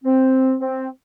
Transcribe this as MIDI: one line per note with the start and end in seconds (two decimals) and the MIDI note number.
0.04 0.54 60
0.61 0.87 60